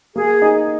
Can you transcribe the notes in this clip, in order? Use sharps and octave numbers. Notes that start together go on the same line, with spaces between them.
A#3 G#4
D#4